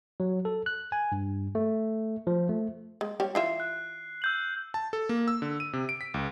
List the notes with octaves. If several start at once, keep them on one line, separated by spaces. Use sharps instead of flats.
F#3
A4
F#6
G#5
G2
A3
F3
A3
G#3
G3 G4 C#5
E3 F4 E5 C7
F#6
E6 G6 F#7
A5
A4
A#3
E6
D3
D#7
C3
D7
B6
C#2